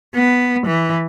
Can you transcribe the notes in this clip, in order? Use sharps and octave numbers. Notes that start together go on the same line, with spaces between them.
B3
E3